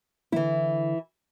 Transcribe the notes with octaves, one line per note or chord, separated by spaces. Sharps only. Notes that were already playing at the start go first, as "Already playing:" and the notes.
D3 E3 E4